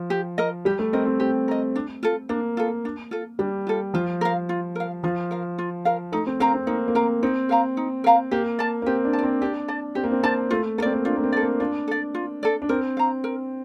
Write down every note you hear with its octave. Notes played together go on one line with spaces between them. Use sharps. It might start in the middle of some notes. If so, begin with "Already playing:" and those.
Already playing: F3
G4
A#4 D#5
G3 G4
A3
C4 A#4 D#5
C4
C4 G4
A#4 D#5
D4
F4 A4
A#3 D4
F4 A4
D4
F4 A4
G3 D4
F4 A4
F3 F4
A#4 F5
F4
A#4 F5
F3 F4
A#4 F5
F4
A#4 F5
A3 D#4
C4
C4 A#4 F5 A#5
C4
A#3 D#4
A#3
C4 A#4 F5 A#5
C4 D#4
A#4 F5 A#5
D#4
A#4 F5 A#5
A#3 G4
D5 A5
A#3
C4 G4
D4
A5
C4 D5
D4 G4
D5 A5
C4 G4
A#3
C4
C4 D5 A5
A3 F4
A#3 A4
C4 D5
A#3
D4 F4
A#3
C4
A4 D5
A#3
D4 F4
A4 D5
F4
A4 D5
D4
C4 A#4
F5 A#5
A#4